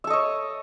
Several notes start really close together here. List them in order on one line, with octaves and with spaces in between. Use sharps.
E5 A4 D#5 C#5